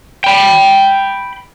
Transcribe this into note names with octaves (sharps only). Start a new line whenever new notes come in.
G5 B5